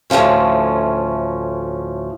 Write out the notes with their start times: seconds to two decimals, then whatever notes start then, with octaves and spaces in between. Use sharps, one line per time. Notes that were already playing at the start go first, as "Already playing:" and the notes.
0.10 D2 A2 C3 F3 C#4